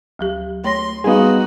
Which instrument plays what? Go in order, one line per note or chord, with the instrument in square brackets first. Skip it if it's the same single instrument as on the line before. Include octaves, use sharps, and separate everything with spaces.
[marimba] D2 F#3 G4
[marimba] A3 C#5 A#6 [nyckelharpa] C6
[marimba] G3 F5 [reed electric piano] B3 G#4 [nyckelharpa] D#4 F#4